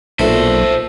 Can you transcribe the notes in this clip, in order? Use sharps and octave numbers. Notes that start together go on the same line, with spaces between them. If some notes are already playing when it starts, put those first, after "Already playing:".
B1 A#2 A3 A4 C5